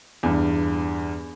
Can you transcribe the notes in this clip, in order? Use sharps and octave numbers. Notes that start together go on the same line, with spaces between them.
E2 G2